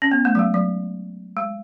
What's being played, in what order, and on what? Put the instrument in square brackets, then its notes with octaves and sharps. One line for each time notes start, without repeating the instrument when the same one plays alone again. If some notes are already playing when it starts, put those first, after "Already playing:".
[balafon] C#4
B3
A3
F#3
G#3
F#3
G#3